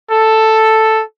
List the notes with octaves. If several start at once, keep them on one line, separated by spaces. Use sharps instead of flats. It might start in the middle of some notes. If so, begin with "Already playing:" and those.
A4